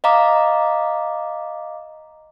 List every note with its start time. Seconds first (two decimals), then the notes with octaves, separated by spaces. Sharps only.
0.04 D#5 F5 A#5 D6